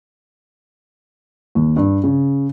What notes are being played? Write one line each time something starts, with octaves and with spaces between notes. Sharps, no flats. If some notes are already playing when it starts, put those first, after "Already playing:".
D#2
G2
C#3